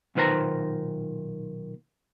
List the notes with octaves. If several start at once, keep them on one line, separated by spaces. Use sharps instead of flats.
B1 A#2 D#3 B4 C5 A#5